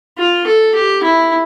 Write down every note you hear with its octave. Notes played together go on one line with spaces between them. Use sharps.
F4
A4
G4
E4